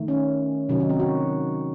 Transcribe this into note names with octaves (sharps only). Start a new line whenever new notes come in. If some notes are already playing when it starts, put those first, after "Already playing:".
Already playing: D#3 A3
C#4
C3 D#3 F#3 C#4
D#4
C4
F#4